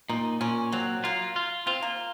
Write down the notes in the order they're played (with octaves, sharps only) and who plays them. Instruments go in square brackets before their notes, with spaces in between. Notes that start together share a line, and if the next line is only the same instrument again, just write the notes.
[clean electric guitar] A#2 [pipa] D#4
[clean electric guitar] A#2 [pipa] C#4
[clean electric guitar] F#3 [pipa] C4
[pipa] A#3 [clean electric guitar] F4
[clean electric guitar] F4
[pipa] C4 [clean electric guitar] F4
[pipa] A#3